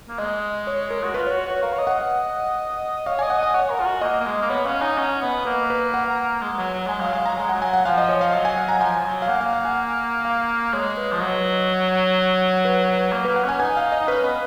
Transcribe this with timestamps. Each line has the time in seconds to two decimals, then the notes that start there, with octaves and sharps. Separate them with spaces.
0.08 A#3
0.18 G#3 D#5
0.67 C#5
0.90 A#4
1.04 F#4
1.14 F4 B4
1.26 C#5
1.31 F#4
1.46 F#4 C#5
1.63 A#4 F5
1.72 C#5
1.79 D#5
1.87 F#5
1.95 D#5
3.06 C#5 F5
3.19 G#5
3.22 D#5
3.30 F#5
3.38 D#5 G#5
3.54 C#5 F#5
3.70 A#4
3.80 F4
3.86 F#4
4.01 A#3 D#5
4.20 A#3
4.26 G#3
4.41 A#3
4.50 B3 C#5
4.65 C#4 F5
4.81 D#4 G#5
4.98 C#4 F#5
5.22 B3 D#5
5.45 A#3 B4
5.70 B4
5.94 F#5
6.10 A#5
6.41 G#3
6.53 G#3
6.58 F#3
6.74 F#3
6.87 G#3 G#5
7.00 F#3 F5
7.13 G#3 F5
7.26 F#3 A#5
7.37 G#3 G#5
7.49 F#5
7.53 F#3
7.62 G#5
7.73 F#5
7.85 F3 F5
7.98 D#5
8.09 C#5
8.21 F5
8.33 F#3
8.45 G#5
8.58 F#5
8.69 A#5
8.81 F3 G#5
9.00 F3
9.05 F#3
9.22 F5
9.29 A#3 F#5
9.41 F5
9.53 F#5
9.65 G#5
10.25 F5
10.73 G#3 C#5
10.97 B4
11.12 F3
11.20 F#3 D#5
12.65 B4
12.89 B4
13.12 A#3
13.25 B4
13.28 A#3
13.36 F#5
13.44 C#4 G#5
13.60 D#4 G#5
13.77 F5
13.92 D#5
14.00 D#4
14.08 C#4 B4
14.24 B3